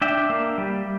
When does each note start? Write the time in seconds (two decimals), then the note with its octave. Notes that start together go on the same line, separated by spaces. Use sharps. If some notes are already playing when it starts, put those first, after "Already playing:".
0.01 D4 E5 G5
0.30 A#3
0.58 G3